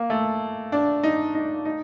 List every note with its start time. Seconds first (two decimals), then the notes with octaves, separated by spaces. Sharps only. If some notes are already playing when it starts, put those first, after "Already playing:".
Already playing: A#3
0.10 A3
0.72 D4
1.03 D#4
1.35 D#4
1.65 D#4